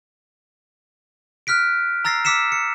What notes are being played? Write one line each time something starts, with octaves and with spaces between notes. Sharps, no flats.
F6 F#6 B6 D7
A#5 E6 A6 A#6 C7
D6 E6 B6 C#7 E7
C#7